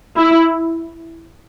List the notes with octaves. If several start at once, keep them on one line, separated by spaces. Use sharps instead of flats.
E4